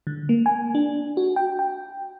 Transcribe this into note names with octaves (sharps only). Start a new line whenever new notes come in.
D3
A#3
G#5
D4
F#4
G5
G5